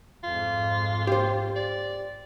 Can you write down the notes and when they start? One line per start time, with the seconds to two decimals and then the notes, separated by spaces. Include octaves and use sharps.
0.24 F2 G#2 F4
1.07 G4 C5
1.56 D5